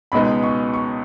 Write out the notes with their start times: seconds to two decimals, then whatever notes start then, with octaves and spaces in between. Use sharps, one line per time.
0.12 C#2 B2 G#3 B3 D#4 B5
0.43 C#6
0.74 C#6